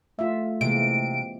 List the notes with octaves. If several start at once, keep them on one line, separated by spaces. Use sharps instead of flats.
A3 F4 E5
C3 E3 G#3 A#3 D7